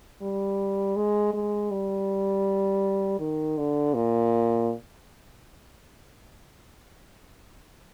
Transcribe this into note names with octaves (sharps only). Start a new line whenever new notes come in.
G3
G#3
G#3
G3
D#3
D3
A#2